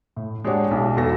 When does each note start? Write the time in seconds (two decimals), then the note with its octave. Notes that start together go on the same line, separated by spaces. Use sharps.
0.16 A2
0.45 G#3 D4 G4 C#5 F#5
0.71 B1 E4
0.97 E2 F#3 A4 A#6